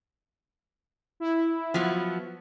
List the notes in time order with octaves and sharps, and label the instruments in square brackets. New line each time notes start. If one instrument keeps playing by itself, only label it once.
[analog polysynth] E4
[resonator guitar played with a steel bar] F3 F#3 B3